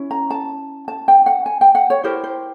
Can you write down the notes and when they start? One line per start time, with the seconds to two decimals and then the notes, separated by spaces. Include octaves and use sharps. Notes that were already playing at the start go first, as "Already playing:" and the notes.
Already playing: C#4 E4
0.11 A#5
0.30 A5
0.88 A5
1.08 G5
1.26 F#5
1.46 G#5
1.61 G5
1.75 F#5
1.90 C#5
2.03 E4 G4 A#4 C5
2.24 C5